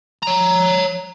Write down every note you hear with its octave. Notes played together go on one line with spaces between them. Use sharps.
C#5 A#5